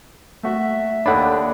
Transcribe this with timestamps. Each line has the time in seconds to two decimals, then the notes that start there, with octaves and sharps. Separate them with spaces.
0.43 A3 F#4 E5
1.06 D#2 D4 A4 C#5 D5 F#5 B5